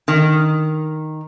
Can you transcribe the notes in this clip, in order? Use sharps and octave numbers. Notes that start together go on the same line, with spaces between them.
D#3